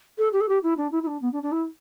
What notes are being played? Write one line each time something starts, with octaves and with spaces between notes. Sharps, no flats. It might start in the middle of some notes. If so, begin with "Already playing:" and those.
A4
G4
A4
G4
E4
D4
E4
E4
D4
B3
D4
D4
E4